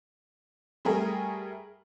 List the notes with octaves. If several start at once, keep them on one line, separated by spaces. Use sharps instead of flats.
G3 A3 G#4 A#4 G5